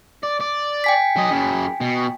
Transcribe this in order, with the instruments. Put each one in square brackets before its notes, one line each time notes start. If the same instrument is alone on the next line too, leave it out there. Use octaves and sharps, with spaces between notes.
[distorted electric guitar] D5
D5
[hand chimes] G5 G#5 B6
[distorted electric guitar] F#3 D#5
F#2 C#3
B2